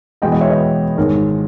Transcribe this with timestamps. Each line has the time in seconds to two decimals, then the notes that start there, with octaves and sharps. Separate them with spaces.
0.22 E2 B2 G#3 B3 D#5 G5
0.32 D#5 G5
0.41 C#5 E5
0.50 B4 D#5
0.97 G#1 G#2 D#3 G#3 A#4 C#5